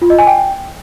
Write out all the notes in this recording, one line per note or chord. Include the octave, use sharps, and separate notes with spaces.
F4
D#5
G#5
G5